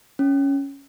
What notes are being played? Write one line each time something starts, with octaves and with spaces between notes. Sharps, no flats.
C#4